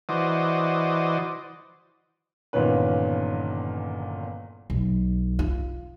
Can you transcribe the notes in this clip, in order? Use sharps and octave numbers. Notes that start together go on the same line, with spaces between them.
E3 F#4 C5 D5 D#5
G1 E2 A#2 D#3 C#4 B4
B1
F4